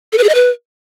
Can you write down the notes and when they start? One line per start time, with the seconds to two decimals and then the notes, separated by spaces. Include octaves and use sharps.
0.13 A4
0.18 B4
0.24 G#4
0.29 D#5
0.35 B4